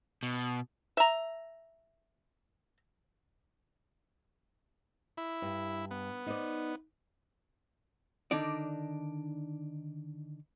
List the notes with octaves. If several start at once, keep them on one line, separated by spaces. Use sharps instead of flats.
B2
E5 A#5
E4
G2
B3
D#4 C5 D5
D3 D#3 D4 D#4 D5